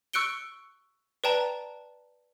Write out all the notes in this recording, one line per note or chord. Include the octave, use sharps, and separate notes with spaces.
C#6 E6 F#6 C#7 D7 G7
B4 D5 G5 A5 A#5